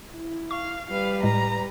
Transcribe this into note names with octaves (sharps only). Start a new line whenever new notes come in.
E4
F5 C#6
G3 B4 F5
A2 G#3 A#5